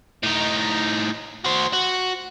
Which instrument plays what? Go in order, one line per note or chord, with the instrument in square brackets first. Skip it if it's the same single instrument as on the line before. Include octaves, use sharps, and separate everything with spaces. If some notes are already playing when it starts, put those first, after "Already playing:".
[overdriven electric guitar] A2 D#4
F#4 C5
F#4